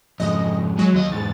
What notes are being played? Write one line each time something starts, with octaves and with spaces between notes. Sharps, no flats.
F2 G#2 D#5
F#3 G#3
D#2 D#5
E2 G#2 A6